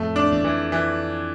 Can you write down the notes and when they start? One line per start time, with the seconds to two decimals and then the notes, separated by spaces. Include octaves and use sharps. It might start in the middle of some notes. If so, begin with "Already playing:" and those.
Already playing: F2 A2 A3
0.16 D4
0.32 E2
0.44 F2 E3
0.72 E3